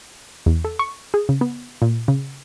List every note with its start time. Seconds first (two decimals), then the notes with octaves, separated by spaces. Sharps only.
0.46 E2
0.64 A4
0.79 C#6
1.14 G#4
1.29 C#3
1.41 B3
1.82 A#2
2.08 C#3